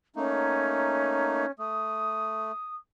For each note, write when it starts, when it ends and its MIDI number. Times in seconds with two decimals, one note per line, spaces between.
0.16 1.46 57
0.16 1.46 58
0.16 1.51 61
0.16 1.46 63
1.59 2.52 57
1.59 2.75 87